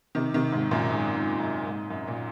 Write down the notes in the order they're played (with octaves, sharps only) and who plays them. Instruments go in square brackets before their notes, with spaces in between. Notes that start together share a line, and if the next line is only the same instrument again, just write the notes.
[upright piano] C3 D#3
C3 D#3
G#2 C3
F#2 A#2
G#2
G#2
F#2
G#2
F#2
A#2